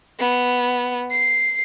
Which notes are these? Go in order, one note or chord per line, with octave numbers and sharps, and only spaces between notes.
B3
C7